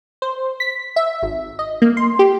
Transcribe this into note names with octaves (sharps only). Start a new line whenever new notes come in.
C5
B6
E5
G#1
D#5
A#3
C6
G4